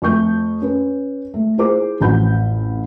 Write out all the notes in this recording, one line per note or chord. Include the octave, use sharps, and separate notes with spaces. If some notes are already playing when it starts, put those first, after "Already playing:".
F2 A3 C#6 G6
C#4 B4
A3
E4 F4 G#4 C5 D6
A1 F2 F#4 B5 G6